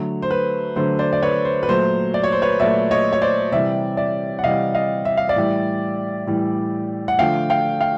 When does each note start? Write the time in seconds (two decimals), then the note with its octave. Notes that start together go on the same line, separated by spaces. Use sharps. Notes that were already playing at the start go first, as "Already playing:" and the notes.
Already playing: D3 F#3 A3
0.22 C5
0.31 B4
0.76 D3 F#3 A3 C5
0.99 C5 D5
1.13 D5
1.22 B4 C#5
1.45 C5
1.63 B4
1.68 A#2 F#3 A3 C5
2.14 D5
2.24 C#5
2.32 C5
2.42 B4 C#5
2.60 A#2 F#3 A3 D5 E5
2.91 C#5 D#5
3.13 C#5
3.21 C5 D5
3.52 C3 E3 G3 D5 E5
3.97 D5 E5
4.39 F#5
4.44 C3 E3 G3 D#5 F5
4.75 D#5 F5
5.05 E5
5.17 F5
5.29 D5 E5
5.36 A2 E3 G3
6.27 A2 E3 G3
7.08 F#5
7.19 D3 F3 A3 F5 G5
7.50 F5 G5
7.81 F5 G5